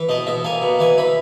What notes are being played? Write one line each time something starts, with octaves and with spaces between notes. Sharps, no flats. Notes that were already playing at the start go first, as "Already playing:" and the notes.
Already playing: E3
B2 D#5
B2 E5
A#3 G#5
B2
E3 G#5
E3 B5